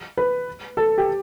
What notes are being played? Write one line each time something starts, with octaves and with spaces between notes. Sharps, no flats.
B4
A4
G4